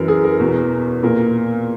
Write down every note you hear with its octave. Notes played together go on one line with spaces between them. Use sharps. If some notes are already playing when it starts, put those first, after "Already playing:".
Already playing: F#2 E3 A#4
G#4
A#4
E2 B2
A#2 A#4